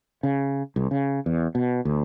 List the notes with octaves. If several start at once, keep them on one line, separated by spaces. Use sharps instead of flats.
C#3
C2
C#3
E2
B2
D2